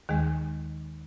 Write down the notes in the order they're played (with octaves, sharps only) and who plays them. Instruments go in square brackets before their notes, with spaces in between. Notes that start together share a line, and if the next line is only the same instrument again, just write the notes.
[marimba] D#2 D#3 G#3 G#4